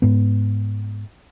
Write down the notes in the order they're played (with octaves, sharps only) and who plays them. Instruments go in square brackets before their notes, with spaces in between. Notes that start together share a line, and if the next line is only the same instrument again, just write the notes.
[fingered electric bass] G#2 B3